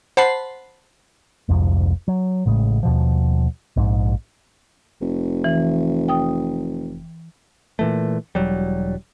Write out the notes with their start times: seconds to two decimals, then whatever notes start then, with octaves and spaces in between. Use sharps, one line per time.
0.17 C5 F#5 A5 B5 C7
1.48 F1 C2 F2 G#2
2.08 F#3
2.46 A1 A2 C#3 G#3
2.83 D#2 B2 F3
3.76 A#1 G#2
5.01 F1
5.44 E3
6.08 G5 D#6
7.79 A#2 E3 A3
8.35 E1 F#3 G3